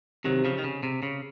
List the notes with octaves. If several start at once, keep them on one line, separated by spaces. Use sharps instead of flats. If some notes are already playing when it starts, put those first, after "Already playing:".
C3 D#3 F#3
C#3 F3
D#3
C#3
C3
C#3